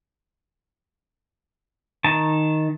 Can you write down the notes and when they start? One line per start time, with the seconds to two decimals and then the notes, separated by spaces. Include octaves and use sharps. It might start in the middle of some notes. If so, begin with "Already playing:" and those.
2.04 D#3 A5